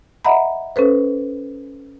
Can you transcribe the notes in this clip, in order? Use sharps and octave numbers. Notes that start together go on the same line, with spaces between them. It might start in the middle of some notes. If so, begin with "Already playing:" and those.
D#5 E5 F#5 A#5 B5
C#4 A4 B4 C5